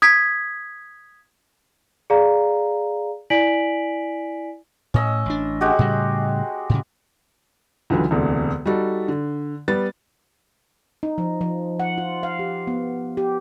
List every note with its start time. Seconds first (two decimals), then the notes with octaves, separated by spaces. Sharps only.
0.02 D#6 G#6 B6
2.10 G#4 D5 F5 A#5
3.30 E4 D5 G#5 B6 D7 F#7
4.94 A2 C#4 D#5 E6
5.26 A1 D4
5.61 G#3 F#4 G4
5.79 A2 C#3 G3
6.70 A2 C#3
7.90 C#2 D3 E3 F#3
8.11 E1 D2 C3
8.66 G3 D#4 F#4 A4
9.08 D3
9.68 G3 B3 A6
11.03 D#4
11.18 F3
11.41 F3
11.80 F#5
11.98 F4
12.23 F5
12.39 G4
12.67 B3
13.17 G4